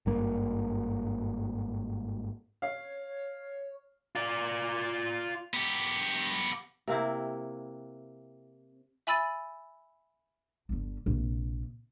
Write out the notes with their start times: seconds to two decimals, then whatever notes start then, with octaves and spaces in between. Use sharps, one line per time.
0.06 G#1 G2 A#3
2.62 C#5 F5
4.15 F4 D5
5.54 B3 G4
6.88 C3 A#3 C4 E4
9.07 E5 G#5 B5 E6 A6 D#7
10.69 G1 D3
11.06 A#1 C3